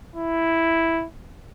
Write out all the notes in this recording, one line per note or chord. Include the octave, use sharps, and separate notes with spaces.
E4